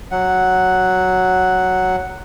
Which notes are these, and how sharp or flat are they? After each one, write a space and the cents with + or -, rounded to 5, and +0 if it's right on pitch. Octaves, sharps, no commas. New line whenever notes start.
F#3 +0 F#5 +0